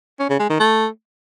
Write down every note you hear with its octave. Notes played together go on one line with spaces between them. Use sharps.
C#4
C#3
G#3
D#3
A3